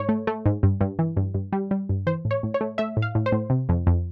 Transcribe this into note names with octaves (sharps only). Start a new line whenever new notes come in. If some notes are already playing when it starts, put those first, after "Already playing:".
Already playing: G#2 C#5
A3
A3
G#2
G2
G2
E3
G2
G2
G3
G3
G2
E3 C5
A2
C#5
A2
C#5
A3
A3 E5
A2
F5
A2
C5
A2
C3
F2
F2